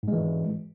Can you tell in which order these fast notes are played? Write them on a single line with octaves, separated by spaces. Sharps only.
G#2 G#3 E3